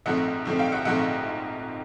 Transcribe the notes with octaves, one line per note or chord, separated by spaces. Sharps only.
A#1 G#2 F3 A3 C4 E5 F#5
A#1 G#2 F3 A3 C4
F5 G5
E5 F#5
A#1 G#2 F3 A3 C4 E5 F#5